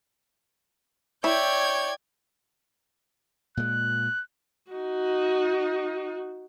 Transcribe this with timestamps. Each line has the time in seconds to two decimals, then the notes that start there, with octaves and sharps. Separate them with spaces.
1.24 E4 C#5 D5 G5 G6 G#6
3.57 A#2 G#3 F#6
4.71 D#4 F#4